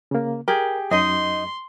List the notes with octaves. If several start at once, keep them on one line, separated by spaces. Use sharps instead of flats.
C#3 A#3
G4 G#4 A#4
F#2 D#4 D#5 C6